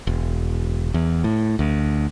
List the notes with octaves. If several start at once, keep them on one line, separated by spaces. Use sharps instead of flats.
E1
E2
A2
D2